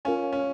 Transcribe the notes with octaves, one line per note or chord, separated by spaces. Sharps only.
C#4 F4 A#4 C#5 F5 G#5
C#4